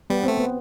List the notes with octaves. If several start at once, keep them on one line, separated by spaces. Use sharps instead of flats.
G3 B3
A3 C4
B3